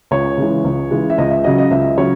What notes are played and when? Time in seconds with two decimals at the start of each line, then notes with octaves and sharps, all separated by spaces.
0.11 C#2 C#5
0.38 C#3 E3 G#3
0.64 C#2
0.91 C#3 E3 G#3
1.10 E5
1.18 C#2 D#5
1.31 E5
1.44 C#3 F#3 C#4 D#5
1.58 D#5
1.71 C#2 E5
1.97 C#3 F#3 C#4 C#5